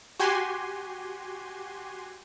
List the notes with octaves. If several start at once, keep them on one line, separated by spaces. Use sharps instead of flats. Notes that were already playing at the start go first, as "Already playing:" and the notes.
F#4 G4 G#5 C6